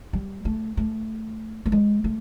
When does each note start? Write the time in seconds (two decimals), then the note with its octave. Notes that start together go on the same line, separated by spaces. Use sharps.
0.13 G3
0.45 A3
0.77 A3
1.66 A3
1.72 G#3
2.04 A3